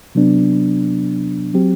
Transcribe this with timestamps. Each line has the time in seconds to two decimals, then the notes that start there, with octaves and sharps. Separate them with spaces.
0.15 C3 F#3 B3 D4
1.54 F#3 C4 G4